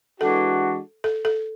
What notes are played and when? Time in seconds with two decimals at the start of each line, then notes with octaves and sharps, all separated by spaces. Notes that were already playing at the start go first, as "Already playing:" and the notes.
0.20 E3 G#3 D4 F#4 A4
1.04 A4
1.25 A4